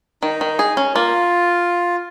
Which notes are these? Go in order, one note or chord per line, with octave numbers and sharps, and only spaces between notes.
D#3 D#4
D#3
G#4
C#4
A#3 F4